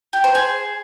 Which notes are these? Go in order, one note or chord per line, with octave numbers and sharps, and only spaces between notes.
G4
C5
G#4